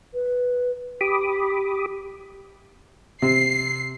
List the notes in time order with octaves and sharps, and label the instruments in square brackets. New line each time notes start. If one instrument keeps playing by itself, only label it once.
[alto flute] B4
[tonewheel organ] G4 B5 D6 D#6
[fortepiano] C3 [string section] C7